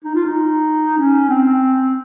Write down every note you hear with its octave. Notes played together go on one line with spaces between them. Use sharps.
D#4
F4
D#4
C#4
C4